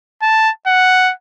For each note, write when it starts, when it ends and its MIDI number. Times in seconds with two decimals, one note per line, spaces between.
0.22 0.50 81
0.67 1.12 78